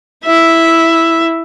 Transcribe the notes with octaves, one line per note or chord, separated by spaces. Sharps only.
E4 E5